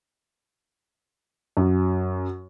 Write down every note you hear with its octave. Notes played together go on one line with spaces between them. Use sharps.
F#2